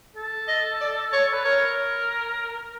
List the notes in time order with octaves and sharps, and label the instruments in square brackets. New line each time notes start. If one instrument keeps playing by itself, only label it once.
[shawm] A4
[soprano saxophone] D#5
D5
C#5
[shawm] B4
[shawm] A#4 [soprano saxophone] C#5